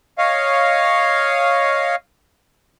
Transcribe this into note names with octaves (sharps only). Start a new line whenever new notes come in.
C#5 D#5 F5